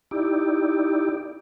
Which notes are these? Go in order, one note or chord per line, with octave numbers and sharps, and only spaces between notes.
D#4 E4 G4 D5